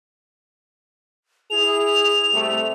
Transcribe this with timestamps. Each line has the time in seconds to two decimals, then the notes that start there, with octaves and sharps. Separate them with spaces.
1.50 E4 G#4 F7
2.33 C3 G3 A3